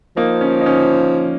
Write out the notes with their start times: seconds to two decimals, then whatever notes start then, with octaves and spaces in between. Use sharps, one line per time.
0.17 F3 A#3 D#4
0.41 C#4
0.61 D#4
0.66 C#4